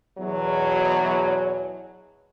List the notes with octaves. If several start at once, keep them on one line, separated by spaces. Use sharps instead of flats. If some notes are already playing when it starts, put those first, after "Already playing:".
E2 B2 F#3